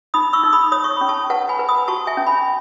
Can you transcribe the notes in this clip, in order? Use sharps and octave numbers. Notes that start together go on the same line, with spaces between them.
D#4 B5 D#6
C#6 E6
D#4
B5 D#6
C#5 D#6
C#6
C#4 B5
A5 C#6
B4 F#5 A5
G#5 B5
B4
B5 D#6
F#4 A5 C#6
E5 G#5
C#4
G#5 B5